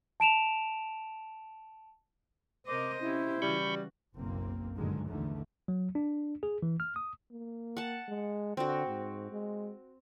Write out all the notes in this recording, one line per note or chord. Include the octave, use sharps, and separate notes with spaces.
A5 D7 E7 F7
C3 A#4 C5 D#5 D6
C#4 E4 G4
C#3 E3 G3 F#4 B5 C#6 G6
F#1 B1 A#3 C4
G2 A#2 D3 D#3 F#3 G#3
A#1 E2 D3 D#3 A3
F#3
D4
G#4
E3
F6
D#6
A#3
F#5 A5
G#3
D3 C4 F#4
G#2
G#3